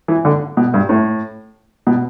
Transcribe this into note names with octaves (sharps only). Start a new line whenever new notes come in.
E3
D3
B2
G2
A2
B2